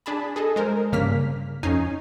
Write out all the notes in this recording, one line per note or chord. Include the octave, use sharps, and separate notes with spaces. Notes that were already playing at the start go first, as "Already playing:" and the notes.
D4 G#4 A5 B5
G#4 A4 D#5
G#3 A#4 C5
G2 C#3 A#3 F6 B6
F2 C#4 D#4 G#5 C7